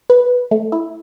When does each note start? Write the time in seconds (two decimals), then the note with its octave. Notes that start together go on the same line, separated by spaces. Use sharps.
0.10 B4
0.51 A3
0.72 E4